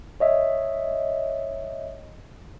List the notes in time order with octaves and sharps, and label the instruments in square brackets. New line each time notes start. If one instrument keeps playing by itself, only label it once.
[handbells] C#5 D#5 E5